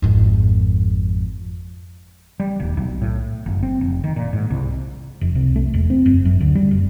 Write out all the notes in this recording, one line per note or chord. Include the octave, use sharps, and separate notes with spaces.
G#1 F2
G3
D#1
B1
A2
F#1
C4
F1
D#3
A#2
G#2
C2
F1
C2
A3
E1
C4
F#1
F#2
D2
G3
F#1